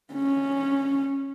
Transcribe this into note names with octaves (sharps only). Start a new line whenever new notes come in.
C#4